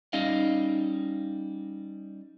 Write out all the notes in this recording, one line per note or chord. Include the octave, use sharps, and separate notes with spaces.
G3 C#4 D#4 D#5 F5